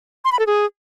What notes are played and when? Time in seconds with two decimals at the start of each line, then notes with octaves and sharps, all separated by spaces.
0.25 C6
0.32 B5
0.39 A4
0.47 G#4